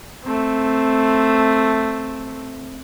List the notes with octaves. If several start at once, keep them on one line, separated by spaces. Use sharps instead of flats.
A3 C4